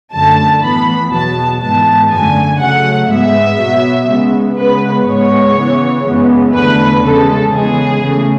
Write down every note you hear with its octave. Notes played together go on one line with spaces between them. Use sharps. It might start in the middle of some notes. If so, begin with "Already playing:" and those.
F#2 D3 A3 A5
A2 E3 B3 B5
E2 B2 F#3 B3 A5
G#2 E3 G#3 B3 A5
F#2 D3 A3 G#5
C#3 F#3 A3 F#5
G#2 G#3 B3 E5
B2 F#3 B3
C#3 G#3 B3
C#3 G#3 B3 B4
G#2 G#3 B3 C#5
C#3 E3 B3
F#2 C#3 E3 G#3 B3
E2 D3 A3 B4
C#3 E3 G#3 A4
C#3 E3 G#3 B3 G#4
C#3 E3 A3